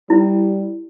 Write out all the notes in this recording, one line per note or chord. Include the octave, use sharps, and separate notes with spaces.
G3 E4